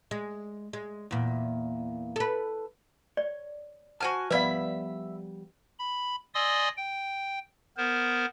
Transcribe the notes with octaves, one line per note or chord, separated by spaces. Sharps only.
G#3
G#3
E2 A#2
A4 B4
C#5 D5
F#4 C5 F#5 G#5 A5 F6
F3 G3 B3 B4 D5 E5 F5 B5
B5
D5 D#5 G#5 C6 D#6 E6
G5
B3 A#4 C5